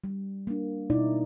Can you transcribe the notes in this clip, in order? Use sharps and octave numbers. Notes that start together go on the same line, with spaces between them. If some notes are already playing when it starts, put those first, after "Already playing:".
G3
A#3 D4
B2 D#4 E4 D5